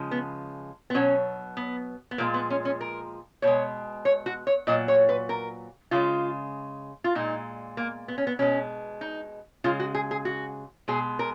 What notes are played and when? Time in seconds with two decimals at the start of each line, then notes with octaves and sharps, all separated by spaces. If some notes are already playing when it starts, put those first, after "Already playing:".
Already playing: C#3 F3 G#3
0.11 B3
0.90 B3
0.94 B2 F#3 C#4
1.57 B3
2.11 B3
2.18 A#2 F3 G#3 A#3
2.34 B3
2.50 C#4
2.65 C#4
2.81 A#4
3.42 B2 G#3 C#5
4.05 C#5
4.26 F#4
4.47 C#5
4.67 A#2 F#3 D#5
4.88 C#5
5.09 B4
5.29 A#4
5.91 C#3 G#3 F4
7.04 F4
7.15 A#2 G#3 D#4
7.77 A#3
8.08 B3
8.18 C#4
8.27 B3
8.39 B2 G#3 C#4
9.01 D#4
9.64 C#3 G#3 F4
9.80 F#4
9.95 G#4
10.11 G#4
10.25 F#4
10.88 B2 G#3 G#4
11.19 A#4